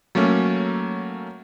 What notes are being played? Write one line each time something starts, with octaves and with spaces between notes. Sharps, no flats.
F#3 A3 A#3 C#4